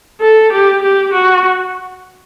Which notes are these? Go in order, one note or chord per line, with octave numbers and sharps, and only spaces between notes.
A4
G4
G4
F#4